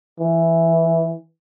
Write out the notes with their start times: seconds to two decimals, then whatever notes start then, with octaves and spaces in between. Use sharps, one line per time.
0.20 E3